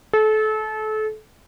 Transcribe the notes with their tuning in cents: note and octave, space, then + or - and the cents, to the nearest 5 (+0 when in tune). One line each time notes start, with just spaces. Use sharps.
A4 -30